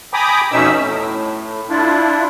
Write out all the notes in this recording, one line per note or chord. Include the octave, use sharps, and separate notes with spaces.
G5 G#5 A#5 B5 D6 D#6
F2 B2 C#4 D#4 E5 E6
A2
D4 E4 F4